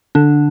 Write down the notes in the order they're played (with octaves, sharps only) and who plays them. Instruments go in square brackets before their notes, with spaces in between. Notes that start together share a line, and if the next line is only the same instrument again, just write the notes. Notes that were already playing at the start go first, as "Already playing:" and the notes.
[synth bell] D3 D4